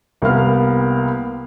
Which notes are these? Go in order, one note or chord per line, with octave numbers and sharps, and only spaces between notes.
C2 G3 A#3 B3 F5 F6